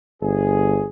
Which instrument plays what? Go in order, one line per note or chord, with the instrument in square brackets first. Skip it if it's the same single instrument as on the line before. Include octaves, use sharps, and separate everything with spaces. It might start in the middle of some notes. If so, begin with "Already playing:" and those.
[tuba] G1 [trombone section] G#4